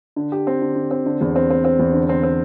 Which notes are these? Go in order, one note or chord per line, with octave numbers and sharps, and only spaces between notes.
D3
G4
C4
D3
D3
C4
D3
E2
C4
C4
C4
E2
D3
C4
C4